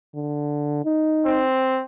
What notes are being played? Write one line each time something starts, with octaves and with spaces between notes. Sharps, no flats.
D3
D#4
C4